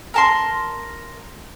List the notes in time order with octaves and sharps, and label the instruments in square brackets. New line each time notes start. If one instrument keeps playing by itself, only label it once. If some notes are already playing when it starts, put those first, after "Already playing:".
[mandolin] A#4 A5 C6